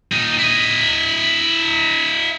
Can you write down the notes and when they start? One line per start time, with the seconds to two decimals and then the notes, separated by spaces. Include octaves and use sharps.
0.12 A#2 D#4
0.39 E4 D#5